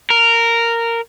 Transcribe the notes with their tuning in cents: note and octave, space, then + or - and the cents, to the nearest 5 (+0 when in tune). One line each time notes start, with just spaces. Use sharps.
A#4 -10